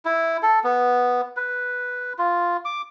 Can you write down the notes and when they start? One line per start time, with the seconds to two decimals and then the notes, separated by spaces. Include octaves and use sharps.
0.05 E4
0.43 A4
0.64 B3
1.37 B4
2.19 F4
2.65 D6